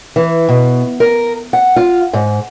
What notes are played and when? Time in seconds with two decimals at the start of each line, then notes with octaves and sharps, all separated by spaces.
0.16 E3
0.49 B2
1.00 A#4
1.53 F#5
1.76 F4
2.13 G#2